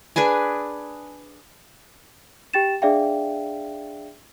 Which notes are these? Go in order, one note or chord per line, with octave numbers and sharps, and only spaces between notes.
D4 G#4 B4 G#5
G4 G5 A6 E7
D4 G#4 D5 E5 F5 G5